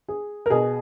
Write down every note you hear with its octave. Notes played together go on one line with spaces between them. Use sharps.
G#4
A#4
B2 G#4